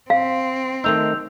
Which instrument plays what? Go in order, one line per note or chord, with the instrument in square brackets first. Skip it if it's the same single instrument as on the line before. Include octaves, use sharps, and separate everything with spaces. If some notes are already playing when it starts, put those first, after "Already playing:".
[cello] C4 [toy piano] F5
[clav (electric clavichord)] D#3 A3 D#4 [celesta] E6 G6 F7